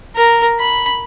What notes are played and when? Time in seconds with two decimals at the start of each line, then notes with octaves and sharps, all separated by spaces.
0.16 A#4
0.60 B5